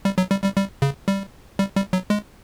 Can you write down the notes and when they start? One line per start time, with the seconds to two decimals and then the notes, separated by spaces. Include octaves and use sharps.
0.05 G3
0.18 F#3
0.31 G3
0.44 G3
0.57 G3
0.82 C#3
1.08 G3
1.59 G3
1.76 G3
1.93 F#3
2.10 G#3